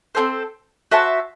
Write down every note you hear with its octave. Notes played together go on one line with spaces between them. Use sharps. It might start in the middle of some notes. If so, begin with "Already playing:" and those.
C4 F#4 A4 C5
F#4 C5 E5 A5